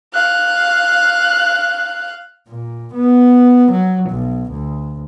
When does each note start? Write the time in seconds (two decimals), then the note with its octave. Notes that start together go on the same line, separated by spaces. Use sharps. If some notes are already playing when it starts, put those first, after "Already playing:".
0.14 F5 F#6
2.48 A#2
2.94 B3
3.72 F#3
4.10 B1
4.51 D2